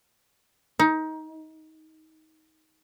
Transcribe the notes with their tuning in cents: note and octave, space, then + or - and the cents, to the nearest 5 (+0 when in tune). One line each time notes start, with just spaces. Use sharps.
D#4 +20